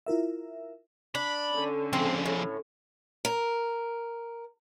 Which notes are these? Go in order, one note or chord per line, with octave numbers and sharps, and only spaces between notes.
E4 F4 A#4 E5
D4 B5
D3 C#4
F3 G#3 C4
A2
A#4